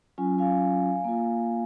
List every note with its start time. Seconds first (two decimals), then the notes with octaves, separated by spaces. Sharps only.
0.18 F#3 C#4 F4 G#5
0.38 F5 G#5
1.04 A#3 F4